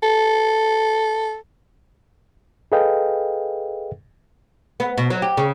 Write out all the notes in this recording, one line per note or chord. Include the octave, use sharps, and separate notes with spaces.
A4
G#4 A4 B4 D#5 F5 G5
B3
B2
F#3
G4
C#3